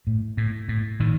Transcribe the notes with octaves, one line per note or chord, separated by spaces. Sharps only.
A2
A2
A2
A2 D#3